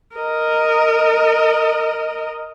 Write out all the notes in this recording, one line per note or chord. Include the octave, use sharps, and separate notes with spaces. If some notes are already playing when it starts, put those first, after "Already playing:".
A#4 D#5